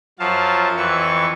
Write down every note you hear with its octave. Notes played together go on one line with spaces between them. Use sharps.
F#2 F3 F#3 F5 A5
F2 E3 B4 C#6